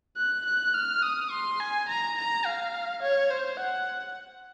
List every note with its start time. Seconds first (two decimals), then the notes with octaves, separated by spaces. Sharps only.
0.17 F#6
0.46 F#6
0.74 F6
1.02 D#6
1.31 C6
1.60 G#5
1.89 A#5
2.17 A#5
2.46 F5
3.02 C#5
3.30 C5
3.60 F#5